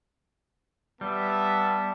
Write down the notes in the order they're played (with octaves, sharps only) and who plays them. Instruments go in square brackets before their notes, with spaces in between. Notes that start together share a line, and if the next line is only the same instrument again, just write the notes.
[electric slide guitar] G3 [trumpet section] B3 E5 A5